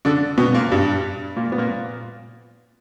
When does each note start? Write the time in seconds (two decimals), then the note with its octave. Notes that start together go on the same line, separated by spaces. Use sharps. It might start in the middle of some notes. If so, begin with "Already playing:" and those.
0.05 D3 D4
0.38 B2 B3
0.54 A#2 A#3
0.72 G2 G3
1.36 A#2 A#3
1.52 B3
1.58 A#2 A#3